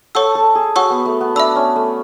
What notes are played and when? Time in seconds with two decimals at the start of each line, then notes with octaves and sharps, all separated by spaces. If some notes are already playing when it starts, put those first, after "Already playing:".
0.15 A4 C#5 F#5 C#6 E6
0.35 A4
0.55 G#4
0.76 F#4 C#5 F#5 C#6 E6
0.90 B3
1.05 A3
1.21 B3
1.35 D4 E5 B5 E6
1.56 C#4
1.76 A3